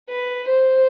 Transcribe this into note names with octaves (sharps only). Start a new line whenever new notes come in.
B4
C5